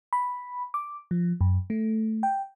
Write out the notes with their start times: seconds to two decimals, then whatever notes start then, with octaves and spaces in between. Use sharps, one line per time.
0.13 B5
0.74 D6
1.11 F3
1.41 F#2
1.70 A3
2.23 G5